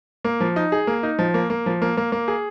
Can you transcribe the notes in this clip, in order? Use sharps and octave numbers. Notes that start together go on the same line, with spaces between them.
A#3
F3
D#4
G#4
A#3
D#4
F3
A#3
A#3
F3
A#3
A#3
A#3
G#4